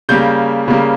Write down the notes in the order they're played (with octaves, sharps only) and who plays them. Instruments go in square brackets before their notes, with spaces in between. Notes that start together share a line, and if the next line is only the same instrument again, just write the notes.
[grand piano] C#3 G3 A#3 G6
C#3 G3 A#3